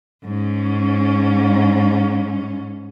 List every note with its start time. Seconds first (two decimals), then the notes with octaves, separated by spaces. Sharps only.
0.24 G#2 C#4